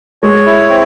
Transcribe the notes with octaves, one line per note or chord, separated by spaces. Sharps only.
G#3 C#5
E4
C4